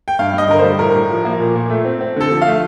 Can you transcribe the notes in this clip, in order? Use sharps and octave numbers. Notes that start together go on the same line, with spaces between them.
G5
G2 F5
G2 D#5
D3 A#4
G3 C5
A2 A#4
A2
F3
A#3
A#2
A#2
A3
C4
C4
D3 A4
F3
F5
A3